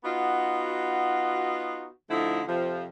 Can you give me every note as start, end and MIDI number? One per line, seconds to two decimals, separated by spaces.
0.04 1.88 59
0.04 1.88 63
0.04 1.88 65
0.04 1.88 66
2.10 2.41 50
2.10 2.41 53
2.10 2.41 57
2.10 2.41 63
2.10 2.41 64
2.48 2.84 41
2.48 2.84 48
2.48 2.84 53